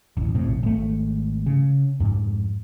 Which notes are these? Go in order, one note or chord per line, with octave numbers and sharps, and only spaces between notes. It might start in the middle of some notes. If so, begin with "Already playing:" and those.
D#1 A1
A#1 F2 A2 C3
G#1 A3
C#3
F2 G#2